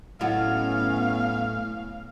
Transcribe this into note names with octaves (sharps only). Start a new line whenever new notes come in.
A2 F#3 B3 C#4 D#5 F5 F#5 B5